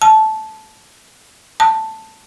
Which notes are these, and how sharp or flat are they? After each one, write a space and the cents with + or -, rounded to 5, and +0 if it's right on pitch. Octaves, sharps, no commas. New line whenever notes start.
A5 -15
A5 +5